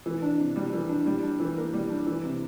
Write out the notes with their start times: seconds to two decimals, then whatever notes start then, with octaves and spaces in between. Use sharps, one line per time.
0.06 E3
0.22 D4
0.39 C3
0.56 G3
0.73 E3
0.89 D4
1.06 G3
1.23 D4
1.40 E3
1.56 A#3
1.74 G3
1.90 D4
2.07 E3
2.24 C3